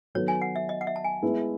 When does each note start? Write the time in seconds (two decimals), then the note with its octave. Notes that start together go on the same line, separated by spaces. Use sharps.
0.15 D#3 F#3 B3 F#4 A4 C#5
0.28 G#5
0.42 F#5
0.56 E5
0.69 D#5
0.81 F#5
0.87 E5
0.96 A5
1.04 G#5
1.22 G#3 B3 E4